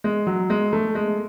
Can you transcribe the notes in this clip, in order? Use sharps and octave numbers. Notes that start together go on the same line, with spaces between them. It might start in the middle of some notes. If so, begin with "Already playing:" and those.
G#3
F#3
G#3
A3
G#3